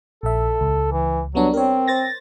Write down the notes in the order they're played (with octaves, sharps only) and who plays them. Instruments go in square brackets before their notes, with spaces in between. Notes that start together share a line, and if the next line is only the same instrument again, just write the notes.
[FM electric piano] A#1 E5 [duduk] A4
[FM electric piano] C#2
[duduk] E3
[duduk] F#3 [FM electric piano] G3 B3 D4
[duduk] C4 [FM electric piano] A#4 C#5
[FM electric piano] C5 A6 A#6